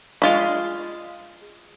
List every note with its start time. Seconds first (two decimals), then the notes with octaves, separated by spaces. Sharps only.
0.22 G#3 F4 B5